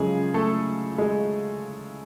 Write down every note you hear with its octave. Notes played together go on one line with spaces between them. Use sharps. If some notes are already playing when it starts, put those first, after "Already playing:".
Already playing: F#2 C#3 F3 G#3 G#4
A3 A4
G#3 G#4